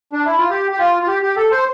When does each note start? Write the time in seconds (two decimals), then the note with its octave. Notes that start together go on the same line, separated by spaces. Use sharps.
0.13 D4
0.25 E4
0.38 F4
0.50 G4
0.71 G4
0.79 F4
1.03 F4
1.08 G4
1.23 G4
1.36 A4
1.52 C5